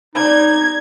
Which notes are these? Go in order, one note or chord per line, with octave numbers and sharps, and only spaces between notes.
G3 D4 D#4 D5 G#6